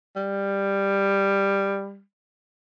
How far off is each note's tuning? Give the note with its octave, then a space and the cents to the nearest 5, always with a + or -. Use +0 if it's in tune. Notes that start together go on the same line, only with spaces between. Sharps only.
G3 +10